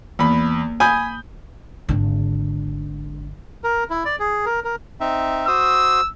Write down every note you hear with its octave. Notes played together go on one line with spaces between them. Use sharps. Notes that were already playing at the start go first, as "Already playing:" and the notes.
E2 A#3 B5
G#5 B5 D#6 G6
G#1 D3
A#4
E4
D5
G#4
A#4
A#4
C4 D#4 E5
F#4 C5 D#6 E6